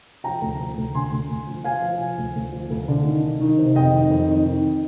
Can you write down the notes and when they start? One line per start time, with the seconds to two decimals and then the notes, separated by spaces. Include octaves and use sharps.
0.24 F3 G5 A#5
0.41 D2
0.59 F3
0.77 D2
0.94 D3 G#5 C6
1.12 D2
1.30 D2
1.47 F3
1.64 F3 F5 G#5
1.82 F3
2.01 F3
2.18 D2
2.35 D2
2.52 F3
2.70 D2
2.88 D3
3.05 D#3
3.23 D#3
3.41 D#3
3.58 C3
3.76 F2 D#5 G5
3.94 D#3
4.10 F2
4.28 D#3
4.46 D#3